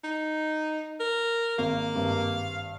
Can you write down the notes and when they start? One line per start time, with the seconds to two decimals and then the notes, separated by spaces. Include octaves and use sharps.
0.04 D#4
1.00 A#4
1.58 G#1 A#3 F5
1.95 G#1 G2